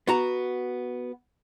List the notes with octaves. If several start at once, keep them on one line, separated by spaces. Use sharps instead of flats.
B3 F#4 A#5